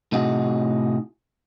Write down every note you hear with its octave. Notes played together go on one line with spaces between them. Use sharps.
A2 C3 D#4 F#4 G#4